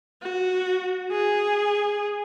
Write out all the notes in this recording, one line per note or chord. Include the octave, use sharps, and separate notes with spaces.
F#4
G#4